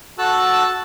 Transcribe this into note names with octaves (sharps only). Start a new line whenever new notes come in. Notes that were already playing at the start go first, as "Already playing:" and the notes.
F#4 A4 A5 E6 F#6